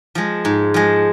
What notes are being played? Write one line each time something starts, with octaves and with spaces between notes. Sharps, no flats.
F3 G#3
G#2
F3 G#3